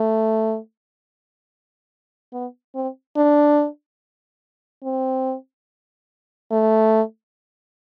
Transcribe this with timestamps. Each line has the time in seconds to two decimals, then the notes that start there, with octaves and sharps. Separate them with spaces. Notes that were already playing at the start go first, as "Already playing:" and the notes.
Already playing: A3
2.33 B3
2.75 C4
3.16 D4
4.84 C4
6.51 A3